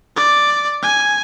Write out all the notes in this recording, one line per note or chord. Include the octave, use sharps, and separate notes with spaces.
D5
G#5